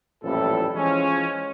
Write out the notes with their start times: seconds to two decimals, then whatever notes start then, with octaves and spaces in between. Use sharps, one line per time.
0.24 A1 F2 A#2 G3 E4 A4
0.75 E3 F3 G#3 C#4